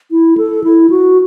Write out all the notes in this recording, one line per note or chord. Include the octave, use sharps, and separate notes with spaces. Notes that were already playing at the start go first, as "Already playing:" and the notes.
E4
A4
E4
F#4